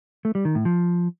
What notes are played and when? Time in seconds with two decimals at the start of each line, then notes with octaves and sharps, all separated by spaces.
0.25 A3
0.35 G3
0.45 D#3
0.55 A2
0.65 F3